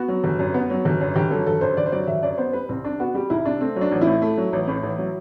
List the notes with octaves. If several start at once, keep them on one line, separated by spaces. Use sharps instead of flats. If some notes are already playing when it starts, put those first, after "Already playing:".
Already playing: B3 F#4
F#3
G1
F#2
B3
F#3
G1
F#2
G1 G4
F#3 A4
G1 A4
F#2 C5
G1 D5
C5
F#3 D5
G1 E5
F#2 D5
B3 C5
G3 B4
C2 C4
C3 D4
B3 F#4
G3 G4
C2 E4
C3 D4
A3 C4
F#3
D4
A1
E4
A2
A3
F#3
A1
A2
A1
F#3